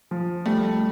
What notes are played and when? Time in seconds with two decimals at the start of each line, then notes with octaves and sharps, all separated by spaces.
0.11 F3
0.46 G3 A3